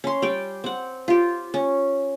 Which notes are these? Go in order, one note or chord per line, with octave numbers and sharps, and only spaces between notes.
C#4 C6
G3 D5 G5
C4 F#5
F4 G4
C#4